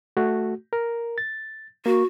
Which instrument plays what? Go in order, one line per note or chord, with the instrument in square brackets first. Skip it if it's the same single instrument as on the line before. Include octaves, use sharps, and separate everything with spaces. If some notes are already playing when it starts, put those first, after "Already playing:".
[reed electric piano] A3 F#4
A#4
A6
[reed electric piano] A#3 [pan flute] F#4